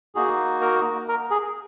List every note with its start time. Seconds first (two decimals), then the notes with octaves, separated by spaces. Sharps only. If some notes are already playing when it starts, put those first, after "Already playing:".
0.15 A#3 D#4 F#4 G#4
0.61 A#4
1.08 A#4
1.31 G#4